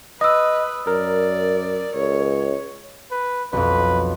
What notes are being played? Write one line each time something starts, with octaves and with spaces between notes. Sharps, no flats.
B4 D#5 D#6 E6
F#2 A#4 D5
C#2 C#5
B4
B1 F2 B4